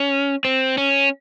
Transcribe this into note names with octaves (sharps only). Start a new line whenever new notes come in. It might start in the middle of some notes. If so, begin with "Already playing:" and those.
Already playing: C#4
C4
C#4